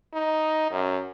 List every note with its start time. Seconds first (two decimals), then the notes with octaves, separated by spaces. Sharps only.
0.14 D#4
0.72 F#2